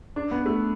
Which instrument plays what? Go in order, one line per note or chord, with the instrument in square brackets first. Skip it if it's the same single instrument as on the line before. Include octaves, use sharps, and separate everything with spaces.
[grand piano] D4
B3
A3